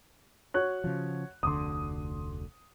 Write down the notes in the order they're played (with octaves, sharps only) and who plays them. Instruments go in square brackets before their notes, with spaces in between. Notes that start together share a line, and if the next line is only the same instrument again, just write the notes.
[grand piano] F#4 C#5 F#6
[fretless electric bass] C#3 F3
[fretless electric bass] F1 D2 D3 [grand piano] C6 D6 D#6